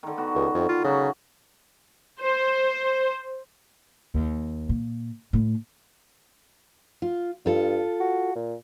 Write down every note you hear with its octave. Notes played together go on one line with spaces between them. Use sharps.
D3 D#3
B3 F#4
C#2
F2
F4
C#3 F#3 F#4 F#5
C5
D#2
A#2
A2 A3
F4
G2 F4 A4
F#4
A#2